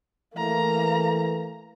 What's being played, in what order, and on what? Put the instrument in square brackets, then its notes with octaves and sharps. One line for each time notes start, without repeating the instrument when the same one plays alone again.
[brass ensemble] E3 A3 [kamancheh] A#3 A#5